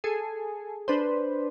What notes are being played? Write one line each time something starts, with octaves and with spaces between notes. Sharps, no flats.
G#4 A4
D4 B4 C5